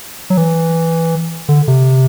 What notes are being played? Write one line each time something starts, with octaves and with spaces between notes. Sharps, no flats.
F#3
E3
D3
C3